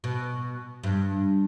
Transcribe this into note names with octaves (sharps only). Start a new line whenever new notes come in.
B2
G2